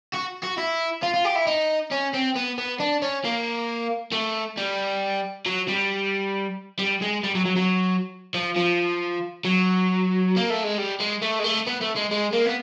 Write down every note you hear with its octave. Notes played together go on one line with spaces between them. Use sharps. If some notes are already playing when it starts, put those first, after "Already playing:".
F#4
F#4
E4
F4
F4
G4
E4
D#4
C#4
C4
B3
B3
D4
C#4
A#3
A3
G3
F#3
G3
G3
G#3
G3
F#3
F#3
F#3
F3
F3
F#3
A#3
A3
G#3
G3
G#3
A3
G#3
A3
B3
A3
G#3
G#3
A#3
B3